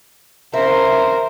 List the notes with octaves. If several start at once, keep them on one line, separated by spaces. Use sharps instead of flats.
C#3 A#4 C5 E5